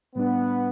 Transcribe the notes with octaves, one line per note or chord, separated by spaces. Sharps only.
A2 G3 B3 D4